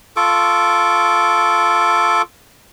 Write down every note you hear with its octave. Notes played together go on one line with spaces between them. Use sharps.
F4 A4 C#6 D6